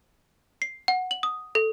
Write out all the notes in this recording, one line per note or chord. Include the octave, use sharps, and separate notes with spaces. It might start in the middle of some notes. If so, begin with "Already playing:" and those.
C7
F#5
F#7
D#6
A4